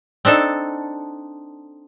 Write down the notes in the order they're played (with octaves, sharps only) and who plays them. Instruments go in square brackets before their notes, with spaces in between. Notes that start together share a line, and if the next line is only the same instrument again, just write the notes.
[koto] C4 D4 D#4 A4